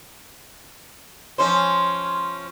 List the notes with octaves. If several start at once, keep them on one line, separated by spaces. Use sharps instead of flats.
F3 C#4 C5